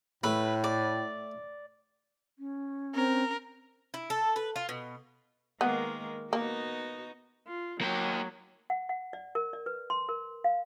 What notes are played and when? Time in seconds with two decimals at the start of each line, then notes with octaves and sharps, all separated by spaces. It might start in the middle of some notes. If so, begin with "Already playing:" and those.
0.24 A2 A3 B4
0.64 D5
2.39 C#4
2.95 C4 A#4
3.94 E4
4.10 A4
4.36 B4
4.56 F4
4.69 B2
5.61 D#3 G#3 A#3 B3
6.33 A#3 B3 D#4 F#4
7.47 F4
7.81 F#3 A#3 G5
8.70 F#5
8.89 F#5
9.13 D5
9.35 A#4
9.53 D5
9.66 B4
9.90 C6
10.09 A#4
10.44 F5